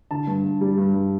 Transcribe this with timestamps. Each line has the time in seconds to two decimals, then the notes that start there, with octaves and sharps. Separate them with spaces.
0.11 D3 A5
0.27 G2
0.44 G2
0.61 G3
0.78 G2
0.94 G2